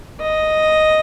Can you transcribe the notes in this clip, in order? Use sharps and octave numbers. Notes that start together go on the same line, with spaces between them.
D#5